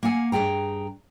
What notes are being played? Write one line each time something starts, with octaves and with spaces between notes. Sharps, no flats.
A#3 F5 F#5 G#5
G2 C#3 G#4 G5 A#5